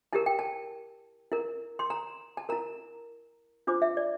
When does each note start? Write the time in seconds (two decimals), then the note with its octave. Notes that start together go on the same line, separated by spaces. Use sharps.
0.13 E4 G4 A#4 A5
0.26 G5
0.39 A5
1.32 E4 A#4
1.79 C6
1.90 A#5
2.37 A5
2.49 E4 A#4 A#5
3.67 D4 F4 C5 D6
3.82 E5
3.97 D5